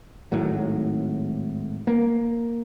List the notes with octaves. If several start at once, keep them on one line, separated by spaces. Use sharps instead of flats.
G#1 A2 F#3
A#3